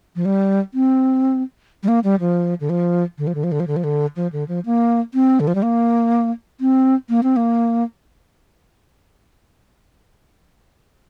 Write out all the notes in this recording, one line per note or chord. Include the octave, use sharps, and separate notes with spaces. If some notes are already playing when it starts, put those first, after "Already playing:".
F3
G3
C4
G3
A#3
G3
F3
D3
F3
D3
F3
D3
F3
D3
F3
D3
F3
D3
F3
D3
F3
A#3
C4
D3
F3
G3
A#3
C4
A#3
C4
A#3